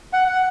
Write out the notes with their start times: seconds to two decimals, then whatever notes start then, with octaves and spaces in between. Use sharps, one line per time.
0.13 F#5
0.28 F#5